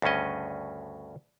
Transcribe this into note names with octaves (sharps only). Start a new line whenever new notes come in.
D2 G2 C#3 C#4 D#5